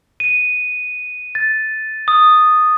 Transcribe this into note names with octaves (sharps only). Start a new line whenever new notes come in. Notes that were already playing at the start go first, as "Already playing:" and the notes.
D#7
A6
D#6